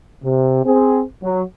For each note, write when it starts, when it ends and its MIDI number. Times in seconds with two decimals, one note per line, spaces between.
0.24 0.64 48
0.65 1.01 60
0.65 1.01 68
1.23 1.43 54